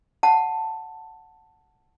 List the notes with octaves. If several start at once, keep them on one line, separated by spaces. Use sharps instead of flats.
F#5 A5